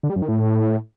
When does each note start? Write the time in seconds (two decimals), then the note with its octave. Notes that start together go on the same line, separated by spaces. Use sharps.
0.03 D3
0.10 G3
0.16 F#2
0.22 D#3
0.28 A2